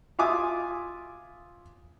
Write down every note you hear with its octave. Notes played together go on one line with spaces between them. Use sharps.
F4 E5 G#5 D6 D#6